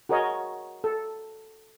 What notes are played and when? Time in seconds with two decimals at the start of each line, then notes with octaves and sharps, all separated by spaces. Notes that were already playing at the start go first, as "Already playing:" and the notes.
0.09 F#4 G#4 A#4 C#5 D#5
0.84 A4